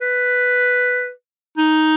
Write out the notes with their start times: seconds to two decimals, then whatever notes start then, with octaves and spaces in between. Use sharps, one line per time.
0.01 B4
1.57 D#4